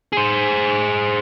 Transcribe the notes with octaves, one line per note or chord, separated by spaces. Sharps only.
G#4 C5